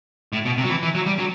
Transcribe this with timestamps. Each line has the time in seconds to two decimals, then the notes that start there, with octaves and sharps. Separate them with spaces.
0.33 A2
0.45 B2
0.58 C3
0.64 F#3
0.70 E3
0.83 E3
0.95 F#3
1.06 G3
1.19 F#3